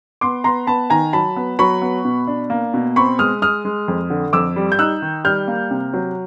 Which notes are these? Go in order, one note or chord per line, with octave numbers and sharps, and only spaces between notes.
B3 C6 D6
B3 A#5 C6
B3 A5 B5
D#3 G#5 A#5
F#3 A5 B5
B3
F#3 B5 C#6
B3
B2
D4
A#3
B2
C4 B5 C#6
G#3 D#6 F6
G#3 D#6 F6
G#3
F2
D3
F2 D6 E6
G3
G6
D#4 E6 F#6
D#3
G3 F6 G6
A#3
C3
F#3